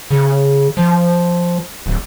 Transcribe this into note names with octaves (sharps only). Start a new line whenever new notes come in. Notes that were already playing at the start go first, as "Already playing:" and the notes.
C#3
F3
D1